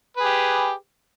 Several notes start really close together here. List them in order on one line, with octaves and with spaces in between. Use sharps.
B4 G#4 G4